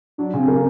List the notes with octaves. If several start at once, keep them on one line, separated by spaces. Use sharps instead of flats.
F#3 D4
C#3
C4
A#3